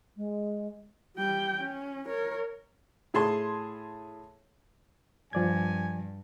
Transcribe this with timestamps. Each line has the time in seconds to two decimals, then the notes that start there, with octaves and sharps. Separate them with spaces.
0.17 G#3
1.17 G3 G5
1.61 C#4
2.06 A#4 C#5
3.14 A2 G#4 A5 C6
5.33 G2 F3 D5 G#5 G#6